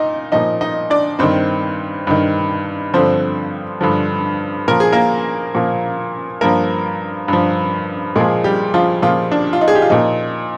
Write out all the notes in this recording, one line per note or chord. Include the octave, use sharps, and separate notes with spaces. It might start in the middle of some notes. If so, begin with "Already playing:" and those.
Already playing: A#2 D#4 D#5
A#2 F3 D#4 D#5
D#4 D#5
D4 D5
G2 D#3 C4 C5
G2 D#3
G2 D3 F3 C4 C5
G2 D3 F3
A#2 F3 A#4
G#4
A#3 A#4
A#2 F3
G2 F3 A#3 A#4
G2 F3
A#2 F3 G#3 G#4
G3 G4
F3 F4
A#2 F3 F4
D4
F4
D#4
G#4
G4
F4
A#2 F3 D#4